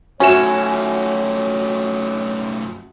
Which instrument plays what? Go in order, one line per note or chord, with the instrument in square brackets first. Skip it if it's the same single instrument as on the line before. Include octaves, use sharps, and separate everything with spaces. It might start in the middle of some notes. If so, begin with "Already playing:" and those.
[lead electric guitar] F#2 A3 [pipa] C#4 [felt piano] F#4 E5 E7 [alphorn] C#5